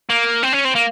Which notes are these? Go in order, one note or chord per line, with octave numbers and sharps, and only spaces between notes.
A#3
C4
C#4
C4
A#3